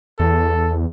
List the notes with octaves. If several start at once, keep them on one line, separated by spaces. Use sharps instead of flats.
E2 A4